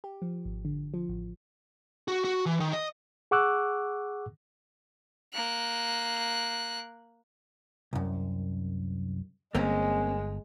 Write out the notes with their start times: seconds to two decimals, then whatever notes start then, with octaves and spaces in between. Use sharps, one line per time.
0.04 G4
0.22 F3
0.45 G#1
0.65 D3
0.94 F3
1.09 A1
2.08 F#4
2.25 F#4
2.46 E3
2.60 D#3
2.73 D#5
3.31 G#4 F#5 C#6 D6 E6 F#6
5.34 A#3 F#6
7.93 C2 F#2
9.55 G1 G#3 A#3 C4 C#4